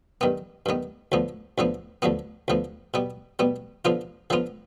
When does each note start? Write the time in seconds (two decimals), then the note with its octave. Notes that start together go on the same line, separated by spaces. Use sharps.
0.21 G2 D#3 B3
0.66 G2 D#3 B3
1.12 D2 D3 F3 B3
1.58 D2 D3 F3 B3
2.02 D2 D3 F3 B3
2.48 D2 D3 F3 B3
2.94 B2 G3 B3
3.39 B2 G3 B3
3.85 D3 F3 B3 F4
4.30 D3 F3 B3 F4